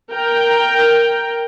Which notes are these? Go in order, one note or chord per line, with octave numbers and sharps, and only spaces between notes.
A#4 G5